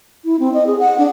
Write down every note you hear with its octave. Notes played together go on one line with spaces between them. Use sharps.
E4
C4
D#5
G#4
F#5
D4